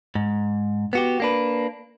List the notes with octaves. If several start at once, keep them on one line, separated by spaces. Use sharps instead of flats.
G#2
B3 F#4 G4
A#3 D4 B4